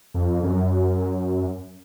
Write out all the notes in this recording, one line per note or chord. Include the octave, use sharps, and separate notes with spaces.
F2
F#2